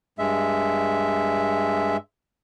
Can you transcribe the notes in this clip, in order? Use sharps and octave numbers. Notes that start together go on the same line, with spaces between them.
G2 G#3 E5